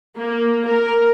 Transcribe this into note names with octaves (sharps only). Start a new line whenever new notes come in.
A#3
A#4